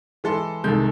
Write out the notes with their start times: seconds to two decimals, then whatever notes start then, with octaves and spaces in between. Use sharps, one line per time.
0.24 E3 G#3 A4 C6
0.64 C2 D#3 G#3 A4 G6